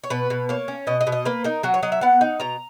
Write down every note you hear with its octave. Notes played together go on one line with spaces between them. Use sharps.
C#5
B2 B4
B2
A#3 C#5
C#4
B2 D#5
D#5
B2
D#5
A#3 B4
D#4 A#4
F#3 F#4
C#5
F#3 D#5
E5
B3 F#5
D#4
B2 A#5